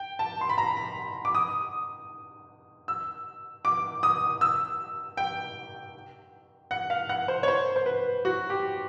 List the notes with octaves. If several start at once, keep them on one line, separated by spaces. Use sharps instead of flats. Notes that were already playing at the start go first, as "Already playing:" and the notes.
Already playing: G5
A5
C6
B5
A#5
B5
D6
D#6
E6
D6
D#6
E6
G5
F#5
F5
F#5
C5
C#5
C5
C5
B4
F#4
G4